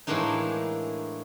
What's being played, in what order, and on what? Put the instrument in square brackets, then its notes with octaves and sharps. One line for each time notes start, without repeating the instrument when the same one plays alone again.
[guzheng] A2 E3 G#3 A#3 D4 D#4